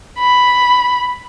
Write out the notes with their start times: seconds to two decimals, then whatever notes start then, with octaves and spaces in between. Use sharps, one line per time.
0.18 B5